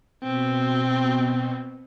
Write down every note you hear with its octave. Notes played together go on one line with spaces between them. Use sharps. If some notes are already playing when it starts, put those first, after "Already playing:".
B2 C4